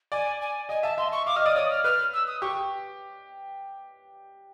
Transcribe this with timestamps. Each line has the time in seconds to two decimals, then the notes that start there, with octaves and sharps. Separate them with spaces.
0.12 D5 G#5
0.41 G#5
0.69 D#5 G#5
0.83 E5 A5
0.98 E5 C6
1.12 C#6
1.26 F5 D6
1.36 D#5 F6
1.46 D5 D#6
1.56 C#5 D#6
1.70 F6
1.84 B4 F6
2.14 E6
2.27 D#6
2.42 G4 C#6